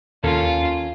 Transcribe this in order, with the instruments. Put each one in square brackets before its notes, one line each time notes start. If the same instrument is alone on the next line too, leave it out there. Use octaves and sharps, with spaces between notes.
[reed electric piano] D#2 [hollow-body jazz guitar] A#3 C#4 A4 [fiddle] F4